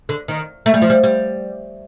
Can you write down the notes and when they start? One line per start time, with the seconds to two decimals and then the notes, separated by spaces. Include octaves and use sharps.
0.09 D3
0.28 D#3
0.66 A3
0.74 G3
0.82 F3
0.90 G3
1.04 G3